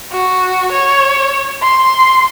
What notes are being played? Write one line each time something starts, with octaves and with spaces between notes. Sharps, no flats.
F#4
C#5
C6